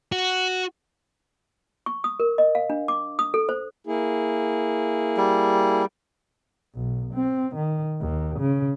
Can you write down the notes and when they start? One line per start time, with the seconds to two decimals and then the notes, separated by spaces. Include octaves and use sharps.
0.12 F#4
1.86 C#6
2.04 D#6
2.20 A#4
2.38 D#5
2.55 F5
2.70 D4
2.88 D6
3.19 D#6
3.34 A4
3.49 C5
3.87 A#3 E4 G#4
5.17 G3
6.75 B1
7.14 C4
7.56 D#3
8.01 D#2
8.40 C#3